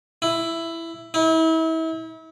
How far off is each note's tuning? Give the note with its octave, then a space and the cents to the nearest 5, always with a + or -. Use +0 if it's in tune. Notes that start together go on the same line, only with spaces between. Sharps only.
E4 +10
E4 -35